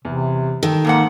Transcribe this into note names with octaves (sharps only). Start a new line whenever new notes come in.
E2 C3
D#3 A4 G5
F2 G#2 A#3 F#5